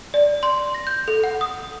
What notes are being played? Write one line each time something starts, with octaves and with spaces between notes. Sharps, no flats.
D5
C6
A#6
G6
A4
F#5
D#6